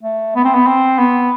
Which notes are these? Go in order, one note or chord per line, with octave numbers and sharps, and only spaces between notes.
A3
B3
C4
B3
C4
B3